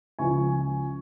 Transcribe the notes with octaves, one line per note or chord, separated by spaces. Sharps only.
C#2 C#3 F3 G#5 C#6